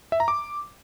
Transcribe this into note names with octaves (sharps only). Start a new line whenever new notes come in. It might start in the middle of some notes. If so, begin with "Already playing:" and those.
E5
A#5
D6